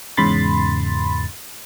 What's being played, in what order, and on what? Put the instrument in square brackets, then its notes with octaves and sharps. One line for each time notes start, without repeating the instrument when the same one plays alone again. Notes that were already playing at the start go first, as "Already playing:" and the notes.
[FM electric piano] E2 G#2 C#3 B5 C6 A6